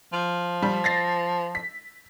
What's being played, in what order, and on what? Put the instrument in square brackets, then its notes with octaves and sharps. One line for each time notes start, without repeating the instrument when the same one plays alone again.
[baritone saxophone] F3
[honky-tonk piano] G3
A6 A#6 C7
B6